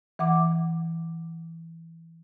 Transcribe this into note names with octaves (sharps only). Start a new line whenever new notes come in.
E3 F#5 D6